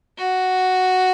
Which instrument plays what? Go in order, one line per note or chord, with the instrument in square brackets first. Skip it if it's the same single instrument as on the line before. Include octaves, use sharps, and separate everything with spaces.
[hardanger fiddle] F#4